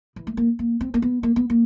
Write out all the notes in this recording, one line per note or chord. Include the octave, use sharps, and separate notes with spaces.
E3
A3
A#3
A#3
C4
A#3
B3
A#3
B3
A#3